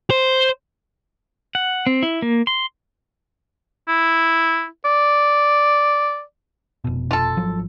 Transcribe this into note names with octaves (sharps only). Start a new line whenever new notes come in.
C5
F#5
C4
E4
A#3
C6
E4
D5
F1 B2
F4 A4
G#1 F3 F#3